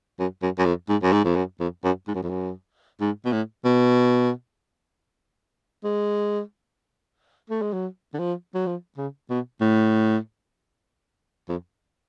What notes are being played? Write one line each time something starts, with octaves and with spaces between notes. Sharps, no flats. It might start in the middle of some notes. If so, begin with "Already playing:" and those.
F#2
F#2
F#2
F2
G#2
F#2
G#2
F2
F#2
F2
F#2
G#2
F#2
F2
F#2
G#2
B2
A2
B2
G#3
A3
G#3
F#3
D3
F3
F#3
F3
C#3
B2
A2
F2